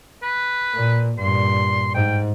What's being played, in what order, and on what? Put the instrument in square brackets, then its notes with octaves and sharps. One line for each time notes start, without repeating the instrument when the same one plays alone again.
[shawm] B4
[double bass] A#2
[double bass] G2 A#2 [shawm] C6
[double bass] G#2 [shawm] G5